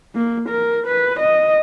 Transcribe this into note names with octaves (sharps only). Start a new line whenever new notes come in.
A#3
A#4
B4
D#5